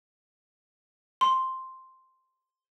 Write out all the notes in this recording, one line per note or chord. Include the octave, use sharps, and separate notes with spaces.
C6